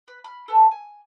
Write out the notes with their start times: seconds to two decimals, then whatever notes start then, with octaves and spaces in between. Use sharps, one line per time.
0.08 B4
0.24 B5 F6
0.48 A4 B4 G#5 A5
0.71 G#5